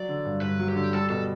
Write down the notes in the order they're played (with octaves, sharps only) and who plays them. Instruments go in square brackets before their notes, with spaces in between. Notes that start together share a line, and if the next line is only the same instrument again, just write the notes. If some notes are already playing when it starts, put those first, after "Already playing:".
Already playing: [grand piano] F#3 [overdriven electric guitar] D5
[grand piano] D3
G2
[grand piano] G2 [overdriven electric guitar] B4
[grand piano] F#3
[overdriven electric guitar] G4
[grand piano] D3
[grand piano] G3 [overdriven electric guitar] A4
[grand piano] B2 [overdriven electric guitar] A4